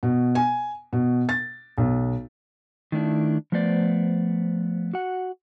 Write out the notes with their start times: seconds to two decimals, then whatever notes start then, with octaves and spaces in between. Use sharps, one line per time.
0.03 B2
0.35 G#5
0.93 B2
1.29 A6
1.78 B1
2.92 D#3 A3 D4 E4
3.52 F3 A3 B3 C5 D5
4.94 F#4 F#5